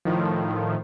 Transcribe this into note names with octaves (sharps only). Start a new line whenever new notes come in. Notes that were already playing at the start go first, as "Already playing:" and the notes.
A2 D#3 F3